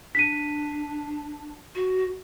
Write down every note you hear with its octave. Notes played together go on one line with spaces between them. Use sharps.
D4 B6 D#7
F#4